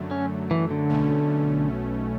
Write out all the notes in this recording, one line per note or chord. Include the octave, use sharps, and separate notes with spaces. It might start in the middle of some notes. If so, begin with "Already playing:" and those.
Already playing: F#2 D3 F#3 A3
C#4
E3
D3
B1 B2 A3 C#4